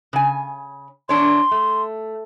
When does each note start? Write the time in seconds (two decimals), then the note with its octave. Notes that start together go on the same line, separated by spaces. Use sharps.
0.13 C#3 G#5
1.09 E2 D4 C#5 C6
1.51 A3